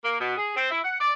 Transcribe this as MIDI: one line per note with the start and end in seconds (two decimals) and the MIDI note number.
0.05 0.18 58
0.20 0.37 47
0.37 0.52 68
0.56 0.69 60
0.71 0.79 64
0.84 0.98 78
1.00 1.13 74